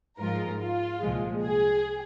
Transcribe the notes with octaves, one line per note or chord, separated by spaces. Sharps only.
G#2 F3 G#3 F4 A#4
F4
C2 A#2 F3 G#3
G#4